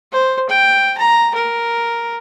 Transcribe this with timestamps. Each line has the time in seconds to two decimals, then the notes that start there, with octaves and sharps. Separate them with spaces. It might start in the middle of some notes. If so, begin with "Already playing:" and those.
0.12 C5
0.49 G5
0.98 A#5
1.35 A#4